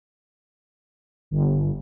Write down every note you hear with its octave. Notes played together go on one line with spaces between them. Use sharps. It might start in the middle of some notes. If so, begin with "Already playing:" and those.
G1